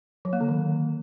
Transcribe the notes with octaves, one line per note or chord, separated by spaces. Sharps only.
F#3
A#3
D3
D#3